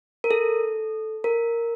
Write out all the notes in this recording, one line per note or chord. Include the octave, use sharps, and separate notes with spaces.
A#4
A4
A#4